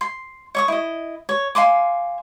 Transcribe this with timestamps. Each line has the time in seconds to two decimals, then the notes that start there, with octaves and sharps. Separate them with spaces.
0.01 C6
0.55 C#5 C#6 D#6
0.68 E4 D#5
1.29 C#5
1.55 F5 G#5 C6 D6